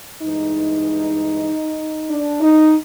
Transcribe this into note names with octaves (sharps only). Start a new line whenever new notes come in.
G2 E3 G#3 D#4
D4
D#4